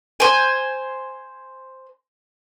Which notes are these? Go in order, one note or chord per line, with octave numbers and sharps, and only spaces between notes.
C5 G#5